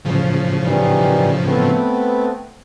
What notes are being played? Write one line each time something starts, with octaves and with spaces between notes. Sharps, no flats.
A2 C#3 F3
D#3 E3 G3
A3 B3 C4